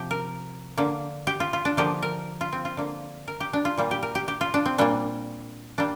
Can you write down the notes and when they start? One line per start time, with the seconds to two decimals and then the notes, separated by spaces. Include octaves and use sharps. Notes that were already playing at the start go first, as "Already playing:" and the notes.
Already playing: C3 F3 G4
0.11 A#4
0.77 D3 A#3
1.27 G4
1.40 F4
1.53 F4
1.65 D4
1.77 D3 F3 A#3 G4
2.02 A#4
2.41 F4
2.53 C4
2.65 F4
2.77 D3 A#3
3.28 A#4
3.40 G4
3.53 D4
3.65 F4
3.77 A#2 G3 A#3
3.91 G4
4.03 A#4
4.15 G4
4.28 G4
4.41 F4
4.54 D4
4.65 C4
4.78 A#2 G3 A#3 D4
5.78 G3 A#3 D4